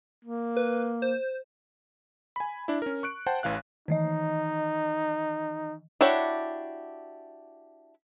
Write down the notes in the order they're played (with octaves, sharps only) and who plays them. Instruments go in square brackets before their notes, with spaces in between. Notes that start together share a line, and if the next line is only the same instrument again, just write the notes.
[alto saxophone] A#3
[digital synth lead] B4
C5
[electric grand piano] G#5 B5
D4 E4
C#4 A#4
C#6 F#6 D7
C5 F#5 G5 A5
A1 E3 F5 F#6
[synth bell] D#3 E3 D#5 [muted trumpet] D#4
[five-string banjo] D4 E4 F#4 G4 C#5